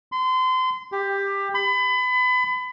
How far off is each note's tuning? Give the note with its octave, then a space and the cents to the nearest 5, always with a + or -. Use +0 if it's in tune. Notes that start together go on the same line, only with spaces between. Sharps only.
C6 -30
G4 +15
B5 +30